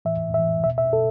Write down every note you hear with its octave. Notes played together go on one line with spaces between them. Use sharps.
A2 E3 E5
A2 E3 E5
B2 E5
E5
B2 A4